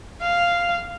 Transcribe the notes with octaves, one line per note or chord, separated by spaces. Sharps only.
F5